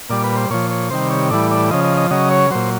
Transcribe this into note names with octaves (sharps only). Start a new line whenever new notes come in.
A#2 G3 D5
B4
C5
A#2 F3 C#5
C#5
C3 D#3 G3 C5
C#5
A2 E3 G3 D5
D5
C#3 F3 D#5
D#5
D#5
C#3 F#3 D#5
C#5
A#2 F#3 C5